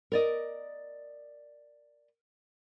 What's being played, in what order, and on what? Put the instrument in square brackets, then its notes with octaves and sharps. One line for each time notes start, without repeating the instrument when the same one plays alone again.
[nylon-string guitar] A#4 D5 D#5